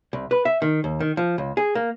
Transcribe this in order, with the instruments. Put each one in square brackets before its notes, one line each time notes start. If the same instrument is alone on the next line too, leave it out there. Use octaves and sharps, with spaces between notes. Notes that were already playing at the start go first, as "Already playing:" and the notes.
[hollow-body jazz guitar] C2
B4
E5
D#3
D#2
D#3
F3
C#2
G#4
A#3